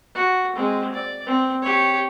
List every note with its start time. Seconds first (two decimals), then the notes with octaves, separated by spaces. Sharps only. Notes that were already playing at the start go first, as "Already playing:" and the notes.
0.15 F#4
0.56 G#3 C4
0.94 D5
1.26 C4
1.62 G4 C#5